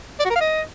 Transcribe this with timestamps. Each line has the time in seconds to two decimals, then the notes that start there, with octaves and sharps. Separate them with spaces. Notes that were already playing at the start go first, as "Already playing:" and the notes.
0.20 D5
0.25 F#4
0.30 A#4
0.36 F5
0.41 D#5